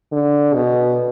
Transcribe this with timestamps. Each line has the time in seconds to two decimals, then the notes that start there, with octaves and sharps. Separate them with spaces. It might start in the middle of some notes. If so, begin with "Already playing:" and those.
0.12 D3
0.54 B2